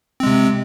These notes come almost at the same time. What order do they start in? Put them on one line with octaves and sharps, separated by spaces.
C4 G#3 C3